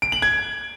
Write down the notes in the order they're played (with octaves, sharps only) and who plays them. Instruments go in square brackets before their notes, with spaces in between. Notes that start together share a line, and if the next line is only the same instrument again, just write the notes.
[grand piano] D7
F#7
G#6